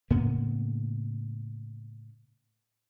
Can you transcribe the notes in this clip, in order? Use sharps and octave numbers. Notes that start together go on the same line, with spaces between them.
A2 C#3 A#3 B3